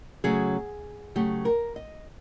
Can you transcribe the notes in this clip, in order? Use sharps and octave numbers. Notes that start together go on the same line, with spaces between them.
C#3 F#3 A3 G#4
C#3 F#3 A3 G4
A#4
D#5